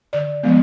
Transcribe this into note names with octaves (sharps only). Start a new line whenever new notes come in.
D3 D5
F3 G#3 B3